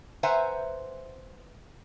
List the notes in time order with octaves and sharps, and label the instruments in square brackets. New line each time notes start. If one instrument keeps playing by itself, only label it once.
[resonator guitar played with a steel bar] B4 C5 E5 F#5 G#5 A#5